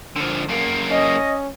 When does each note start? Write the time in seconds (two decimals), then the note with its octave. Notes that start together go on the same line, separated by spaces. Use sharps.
0.16 D3 F3
0.49 F#2 A#3
0.91 C#4 D#5